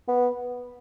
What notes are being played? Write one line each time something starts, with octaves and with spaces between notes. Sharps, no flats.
B3